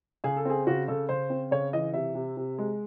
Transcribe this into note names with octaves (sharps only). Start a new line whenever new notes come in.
C#3 G#4
A4
C4 G#4
C#3 F#4
C#3 A4
C#3 C5
C4
C#3 C#5
E3 D#5
C3 E5
C3
C3
G#3